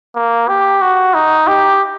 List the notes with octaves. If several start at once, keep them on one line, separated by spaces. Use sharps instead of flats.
A#3
G4
F#4
D#4
G4